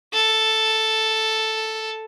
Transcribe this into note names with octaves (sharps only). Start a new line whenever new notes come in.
A4